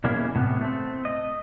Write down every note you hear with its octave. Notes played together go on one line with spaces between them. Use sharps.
B2 E3 A#3 C#4 E4 G#4
A2 C3 B3
A3 C4
D#5